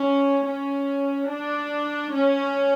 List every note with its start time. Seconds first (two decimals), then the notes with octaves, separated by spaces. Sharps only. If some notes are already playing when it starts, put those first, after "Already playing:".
Already playing: C#4
0.45 C#4
1.29 D4
2.13 C#4